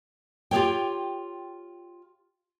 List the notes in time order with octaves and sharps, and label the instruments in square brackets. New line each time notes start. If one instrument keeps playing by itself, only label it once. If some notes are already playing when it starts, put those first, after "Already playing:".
[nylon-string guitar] F4 G4 G#4 A#4 C#5 G5